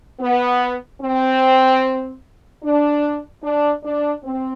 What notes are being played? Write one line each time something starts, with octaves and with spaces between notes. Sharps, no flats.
B3
C4
D4
D4
D4
C4